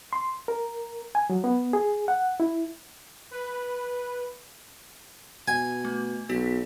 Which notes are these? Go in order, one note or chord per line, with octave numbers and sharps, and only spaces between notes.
C6
A#4
G#5
F#3
B3
G#4
F#5
E4
B4
B2 G#5
A3
B1 B3 F#4 B6